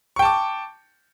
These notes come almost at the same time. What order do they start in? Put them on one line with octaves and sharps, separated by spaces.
C#6 G5 A5 D6